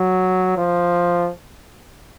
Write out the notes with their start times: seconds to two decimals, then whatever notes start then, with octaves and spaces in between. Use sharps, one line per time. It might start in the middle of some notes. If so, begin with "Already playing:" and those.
Already playing: F#3
0.57 F3